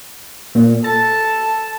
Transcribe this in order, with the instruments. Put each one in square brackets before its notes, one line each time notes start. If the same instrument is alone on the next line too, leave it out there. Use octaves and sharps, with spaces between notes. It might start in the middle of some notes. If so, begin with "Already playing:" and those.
[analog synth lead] A#2
[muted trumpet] A4 [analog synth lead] A5